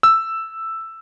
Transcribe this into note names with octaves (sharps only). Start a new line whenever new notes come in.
E6